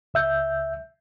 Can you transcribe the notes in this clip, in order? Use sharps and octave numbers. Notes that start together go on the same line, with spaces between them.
C#2 E5 G6